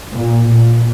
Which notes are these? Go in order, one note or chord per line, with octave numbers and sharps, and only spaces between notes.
A#2
A#2